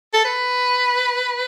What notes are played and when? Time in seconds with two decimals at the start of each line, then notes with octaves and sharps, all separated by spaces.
0.13 A4
0.25 B4